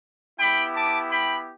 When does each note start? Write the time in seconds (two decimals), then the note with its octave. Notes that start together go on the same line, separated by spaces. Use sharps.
0.38 B3 E4 G4 G5 B5
0.75 A5 D6
1.10 G5 B5